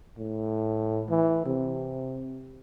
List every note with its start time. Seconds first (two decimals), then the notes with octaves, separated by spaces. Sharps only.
0.18 A2
1.09 E3
1.46 C3